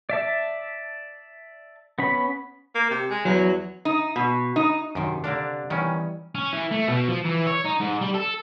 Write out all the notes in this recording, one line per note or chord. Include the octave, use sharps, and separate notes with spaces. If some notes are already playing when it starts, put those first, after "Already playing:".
D5 E5 A5
B3 C#4 B5
A#3
C3
G#3
E2 F#3
D#4
B2
D#4
F#2 C3 D#3
D3 D4 D5 F5 A#5
D#3 E3 G3 B3 C#4
C#4
E3
A3
B2
F3
E3
C#5
D#4
G#2
G3
A4